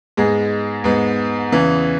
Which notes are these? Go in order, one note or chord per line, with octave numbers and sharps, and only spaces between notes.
G#2 G#3 B3 G#4
G#2 G#3 B3
E2 C#3 E3